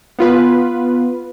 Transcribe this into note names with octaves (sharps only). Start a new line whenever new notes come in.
B3 F4 B4